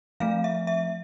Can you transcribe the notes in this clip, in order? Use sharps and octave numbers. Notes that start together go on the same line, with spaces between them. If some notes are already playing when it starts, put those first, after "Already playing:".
F3 A3 C4 F5
E5
E5